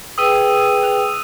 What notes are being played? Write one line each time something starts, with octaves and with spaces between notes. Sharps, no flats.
G#4 B4 G5 D#6 E6 D#7
F#6 F7